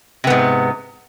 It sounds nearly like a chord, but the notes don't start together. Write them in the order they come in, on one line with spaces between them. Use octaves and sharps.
C3 B3 G#2